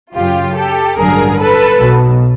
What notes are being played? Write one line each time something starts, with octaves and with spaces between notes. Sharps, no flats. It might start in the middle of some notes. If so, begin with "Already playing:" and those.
F#2 C#3 F#3 F4 G4
G4 A4
A1 G2 D3 F#3 G#4 A#4
A4 B4
B1 B2 F#3